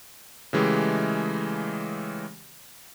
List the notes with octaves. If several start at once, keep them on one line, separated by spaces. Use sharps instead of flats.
C#3 E3 G#3 A3 G4